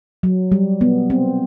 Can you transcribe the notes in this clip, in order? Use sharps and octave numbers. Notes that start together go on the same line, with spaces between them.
F#3
G3
B3
C4